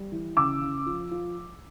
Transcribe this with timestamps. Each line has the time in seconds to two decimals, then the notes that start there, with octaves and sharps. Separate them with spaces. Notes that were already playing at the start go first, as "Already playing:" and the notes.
Already playing: G3
0.12 E3
0.37 C#3 D6 E6
0.61 C#3
0.86 F3
1.11 F3